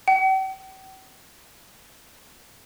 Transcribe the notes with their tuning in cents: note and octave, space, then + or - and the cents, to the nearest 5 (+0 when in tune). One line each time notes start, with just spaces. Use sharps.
G5 -45